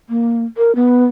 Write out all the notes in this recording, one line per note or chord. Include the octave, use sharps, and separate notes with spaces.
A#3
A#4
B3